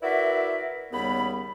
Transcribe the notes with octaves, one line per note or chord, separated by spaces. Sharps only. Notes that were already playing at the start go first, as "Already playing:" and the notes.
E4 F#4 A#4 B4 D5 E5
D#2 C#3 G3 B3 B5